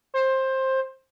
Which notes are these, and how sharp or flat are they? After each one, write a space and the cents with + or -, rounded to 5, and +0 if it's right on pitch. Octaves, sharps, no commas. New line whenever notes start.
C5 +15